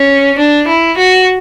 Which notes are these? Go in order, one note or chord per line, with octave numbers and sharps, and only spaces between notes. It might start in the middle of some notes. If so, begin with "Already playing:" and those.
Already playing: C#4
D4
E4
F#4